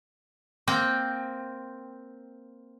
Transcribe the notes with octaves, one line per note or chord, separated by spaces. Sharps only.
A#3 C4 G5